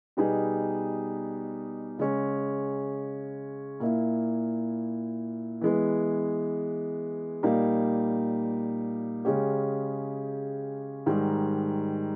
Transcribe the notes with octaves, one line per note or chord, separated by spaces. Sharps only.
B2 G3 B3 D#4 G#4
C#3 G#3 C#4
A#2 A#3 E4
E3 G#3 B3
A#2 G3 A#3 D#4
C#3 G#3 C#4 G4
G#2 D#3 G3